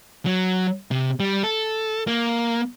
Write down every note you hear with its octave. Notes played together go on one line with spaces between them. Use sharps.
F#3
C3
G3
A4
A#3